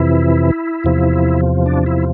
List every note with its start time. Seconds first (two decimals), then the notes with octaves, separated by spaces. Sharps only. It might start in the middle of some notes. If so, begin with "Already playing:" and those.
Already playing: F2 C3 E3 E4
0.84 E2 C3 F3
1.66 D4
1.86 E4